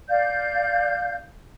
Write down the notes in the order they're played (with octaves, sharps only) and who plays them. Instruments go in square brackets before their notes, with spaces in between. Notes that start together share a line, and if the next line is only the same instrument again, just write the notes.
[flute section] D5 F5 G6